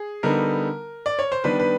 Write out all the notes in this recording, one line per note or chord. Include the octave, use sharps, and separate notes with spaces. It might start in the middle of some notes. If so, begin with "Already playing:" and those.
Already playing: G#4
D3 G3 B3 D#4 A#4
D5
C#5
C5
D#3 G3 B3 D4 B4
B4